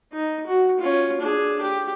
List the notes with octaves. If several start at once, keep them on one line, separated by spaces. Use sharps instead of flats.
D#4
F#4
C#4 F4
D4 G#4
G4